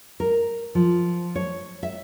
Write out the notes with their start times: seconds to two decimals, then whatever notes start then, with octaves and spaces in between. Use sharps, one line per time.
0.20 A#4
0.75 F3
1.36 C#5
1.83 E5